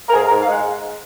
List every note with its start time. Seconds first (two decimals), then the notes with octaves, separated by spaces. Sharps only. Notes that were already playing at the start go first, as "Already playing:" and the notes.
0.09 A#4
0.13 G#2 G#4
0.26 A#4
0.31 G#2
0.41 F5
0.47 G#3 F#5